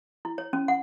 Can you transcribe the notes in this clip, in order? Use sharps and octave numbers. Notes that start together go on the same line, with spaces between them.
E4
C#5
C#4
F#5